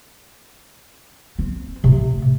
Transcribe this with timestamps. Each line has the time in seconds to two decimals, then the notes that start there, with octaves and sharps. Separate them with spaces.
1.39 C4
1.84 A1 C3